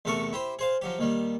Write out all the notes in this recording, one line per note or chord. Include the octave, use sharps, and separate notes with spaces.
E2 C3 A3 A4 A#4 C#6
E4 G4 C5
G#4 C5 F5
F3 F#3 G4
D#2 D#3 G3